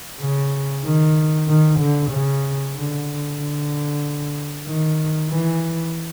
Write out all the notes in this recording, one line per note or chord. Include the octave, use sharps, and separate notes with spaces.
C#3
D#3
D#3
D3
C#3
D3
D3
D#3
E3